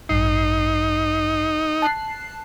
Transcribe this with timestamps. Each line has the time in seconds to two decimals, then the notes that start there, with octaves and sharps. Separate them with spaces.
0.09 A1 G2 D#4 C7
1.82 A5 F#6 C7